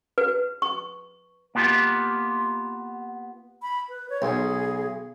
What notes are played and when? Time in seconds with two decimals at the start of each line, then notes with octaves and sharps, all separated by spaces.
0.18 B4
0.62 C#6
1.55 A#3 B3 F4 G4
3.62 B5
3.89 B4
4.10 C#5
4.22 B1 G#4